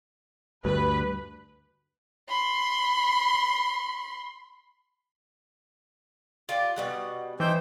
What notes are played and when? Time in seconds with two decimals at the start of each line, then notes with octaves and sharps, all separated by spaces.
0.65 D2 G2 B4
2.28 B5 C6
6.49 F4 G4 D5
6.76 B2 G3 F#5
7.40 E3 D#4 C5 G5